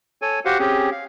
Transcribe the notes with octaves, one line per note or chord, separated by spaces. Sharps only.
A4 C#5 G#5
F#4 G4 C5 F5 F#5
C4 C#4 G4 G#4
F5